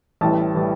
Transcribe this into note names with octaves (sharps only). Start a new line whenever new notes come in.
A1 A2 E3 G3 A5
A2 E3 G3